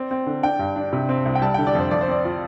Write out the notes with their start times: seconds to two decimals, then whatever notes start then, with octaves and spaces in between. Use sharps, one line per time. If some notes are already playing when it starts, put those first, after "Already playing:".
Already playing: C4 D5
0.11 C4
0.26 D3
0.43 D4 G5
0.59 G2
0.76 D4
0.93 C3
1.09 C4
1.25 C2
1.35 G5
1.42 G3 A5
1.54 D3 G5
1.67 D5
1.75 F2 C5
1.91 F2 D5
2.01 C5
2.08 C4 D5
2.25 F4